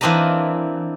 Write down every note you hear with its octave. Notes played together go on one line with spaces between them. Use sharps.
E3 A#3 C4 D4 D#5 A#5